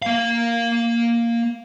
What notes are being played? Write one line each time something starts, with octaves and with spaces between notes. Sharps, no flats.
A#3 F5